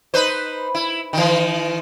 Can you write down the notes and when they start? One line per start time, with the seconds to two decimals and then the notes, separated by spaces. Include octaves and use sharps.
0.14 D#4 B4 C5
0.75 E4
1.13 D#3 E3